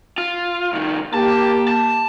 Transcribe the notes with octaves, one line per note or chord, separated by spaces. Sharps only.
F4
C2 D#3
A#3 G4 A5
A5